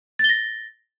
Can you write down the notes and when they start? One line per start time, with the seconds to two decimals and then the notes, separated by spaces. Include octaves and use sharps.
0.19 A6
0.24 G7
0.29 A#6